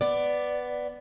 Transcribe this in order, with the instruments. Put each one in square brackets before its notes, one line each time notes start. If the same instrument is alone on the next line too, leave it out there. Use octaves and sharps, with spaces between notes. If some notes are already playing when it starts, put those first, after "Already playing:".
[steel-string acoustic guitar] B3 D5